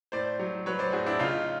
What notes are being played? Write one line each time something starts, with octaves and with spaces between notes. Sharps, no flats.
A2 C5 D5
F#3
F#3 B4 C#5
C5 D5
A2 F#4 G#4
D4 E4
C#3 D#4 F4